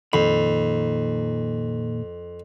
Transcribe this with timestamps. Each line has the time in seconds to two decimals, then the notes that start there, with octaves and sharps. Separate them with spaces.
0.13 F2 A#2 D#3 B5